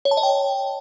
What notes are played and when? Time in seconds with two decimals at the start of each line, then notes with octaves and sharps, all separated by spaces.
0.05 C#5
0.11 A5
0.17 D#5
0.23 G5